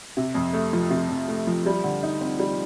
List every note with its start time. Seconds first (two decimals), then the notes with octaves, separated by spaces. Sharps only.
0.17 C3
0.35 F2
0.53 A3
0.73 F3
0.90 C3
1.09 F2
1.28 A3
1.47 F3
1.66 G3
1.83 D3
2.03 D#4
2.21 C4
2.40 G3